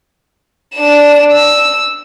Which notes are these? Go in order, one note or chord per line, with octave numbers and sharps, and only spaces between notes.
D4 E7
E6